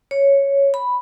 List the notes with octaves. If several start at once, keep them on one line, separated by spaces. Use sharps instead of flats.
C#5
B5